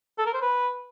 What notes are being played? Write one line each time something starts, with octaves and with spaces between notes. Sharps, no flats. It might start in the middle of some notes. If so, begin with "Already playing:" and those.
A4
A#4
C5
B4